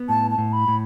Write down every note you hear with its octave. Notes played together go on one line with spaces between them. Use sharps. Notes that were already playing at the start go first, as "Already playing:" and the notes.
Already playing: B3
A2 A5
A5
A2
B5
A2